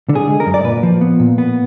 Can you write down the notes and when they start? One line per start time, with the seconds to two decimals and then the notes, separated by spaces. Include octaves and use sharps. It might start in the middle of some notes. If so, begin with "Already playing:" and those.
0.09 D3
0.15 G#4
0.28 G#3
0.40 A#4
0.46 F#2
0.54 D5
0.64 A#2 B4
0.83 F3
1.01 B3
1.20 A#2
1.38 B3